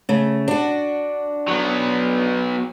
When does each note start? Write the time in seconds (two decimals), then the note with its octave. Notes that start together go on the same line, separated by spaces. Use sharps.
0.09 C#3 A3
0.48 D4 F#4
1.48 F#3 B3